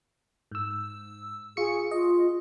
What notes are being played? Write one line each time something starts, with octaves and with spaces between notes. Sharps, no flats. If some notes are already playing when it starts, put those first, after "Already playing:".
G#2 E6
F4 G#4 C#6 C#7
F4 D#5